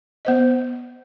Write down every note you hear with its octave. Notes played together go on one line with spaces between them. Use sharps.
B3 C5 D#5